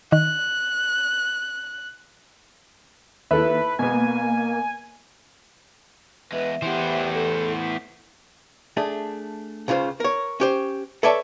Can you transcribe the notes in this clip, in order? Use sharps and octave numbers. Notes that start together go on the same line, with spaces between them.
D#3 F#6
D#2 E4 A4 B4 E5
B2 A#3 B3 G#5
E2 G#3 B4 E5
A2 E3 B3 G4 C5
A4
A3 D4 G#4
C#2 C#3 F4 G4 C5
A#4 C#5
C#4 G4 C5
A4 B4 C#5 D5 E5 A5